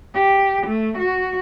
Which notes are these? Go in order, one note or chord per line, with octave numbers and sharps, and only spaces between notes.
G4
A3
F#4